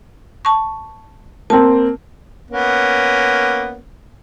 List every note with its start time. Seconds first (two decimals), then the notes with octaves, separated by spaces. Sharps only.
0.45 A5 C#6
1.50 A#3 C4 A5
2.51 A#3 B3 C#4